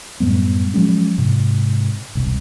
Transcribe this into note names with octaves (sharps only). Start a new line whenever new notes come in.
F#2 A2 G3 B3
F3 F#3 G#3 C#4
G#2 C3
E1 C2